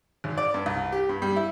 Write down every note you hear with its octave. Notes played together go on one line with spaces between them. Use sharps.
G#1
D5
G2
C2
G4
G2
G3
E4